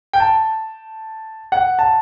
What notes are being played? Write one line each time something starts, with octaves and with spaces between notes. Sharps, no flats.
G5
A5
F#5
A5